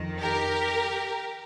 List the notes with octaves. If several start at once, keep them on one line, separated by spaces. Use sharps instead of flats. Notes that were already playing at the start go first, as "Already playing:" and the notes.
Already playing: F2 D#3
G4 A#4